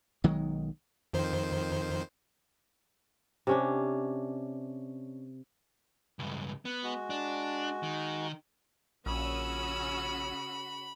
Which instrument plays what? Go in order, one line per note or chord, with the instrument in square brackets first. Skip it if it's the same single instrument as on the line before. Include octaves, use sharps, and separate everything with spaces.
[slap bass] B1 D#3 F#3 G#3
[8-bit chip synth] F2 D#3 C5
[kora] C3 C#4 D4
[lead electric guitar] C#2 G2
[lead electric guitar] B3 [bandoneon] F#6
[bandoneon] G#3 F#4
[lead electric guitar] D4
D#3
[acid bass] A#1 [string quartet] C#3 F#4 [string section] C#4 D#6 E6 [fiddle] B5